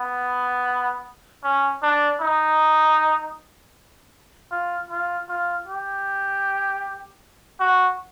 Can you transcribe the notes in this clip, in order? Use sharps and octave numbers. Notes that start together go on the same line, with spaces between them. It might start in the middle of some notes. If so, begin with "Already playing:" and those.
Already playing: B3
C#4
D4
D#4
F4
F4
F4
G4
F#4